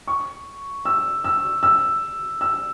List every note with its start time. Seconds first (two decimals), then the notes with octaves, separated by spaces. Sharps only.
0.07 C#6
0.85 E6
1.24 E6
1.63 E6
2.41 E6